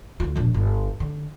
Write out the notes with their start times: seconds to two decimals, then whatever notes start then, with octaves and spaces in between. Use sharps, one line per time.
0.20 D2 F4
0.36 E1 A#1
0.54 G1
1.00 D3